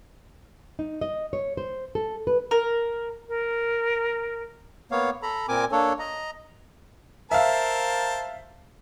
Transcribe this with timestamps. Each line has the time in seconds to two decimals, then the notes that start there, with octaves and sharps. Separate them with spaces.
0.79 D#4
1.01 D#5
1.33 C#5
1.57 C5
1.95 A4
2.27 B4
2.51 A#4
3.28 A#4
4.91 A#3 B3 C#5 F5
5.22 A4 A#5 B5
5.48 A#2 C4 A#4 G#5 D6
5.72 A#3 D4 A4 C#5
5.99 D#5 A#5
7.31 A#4 C5 E5 F5 A5